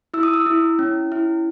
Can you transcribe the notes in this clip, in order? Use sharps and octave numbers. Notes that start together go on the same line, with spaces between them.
E4 E6
D#6
E6
E4
C#4
E4